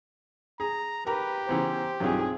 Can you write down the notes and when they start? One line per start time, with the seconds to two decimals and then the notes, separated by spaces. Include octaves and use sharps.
0.60 G#4 A#5
1.06 G4 A#4 B4 A#5
1.49 C#3 E3 B3 C5
2.00 B1 G2 D#3 F#3 C4 F4 G#4